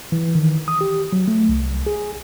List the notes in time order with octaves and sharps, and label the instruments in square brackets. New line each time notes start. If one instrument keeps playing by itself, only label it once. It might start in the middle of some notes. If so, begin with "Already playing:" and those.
[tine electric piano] E3
D#3
D#6
G4
F#3
A3
C2
G#4